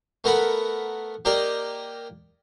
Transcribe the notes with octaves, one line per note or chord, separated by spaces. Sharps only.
A3 B3 A#4 F#5 B5
A#3 G4 A#4 D5 D#5